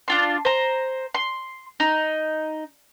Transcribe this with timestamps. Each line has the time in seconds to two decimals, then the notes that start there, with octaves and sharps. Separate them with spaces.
0.08 D4 F4 C6
0.45 C5 A#5
1.14 C6
1.80 D#4